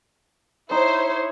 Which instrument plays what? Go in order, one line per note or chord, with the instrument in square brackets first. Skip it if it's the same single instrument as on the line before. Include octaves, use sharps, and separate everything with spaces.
[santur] D#4 [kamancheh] E4 C#5 [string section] C5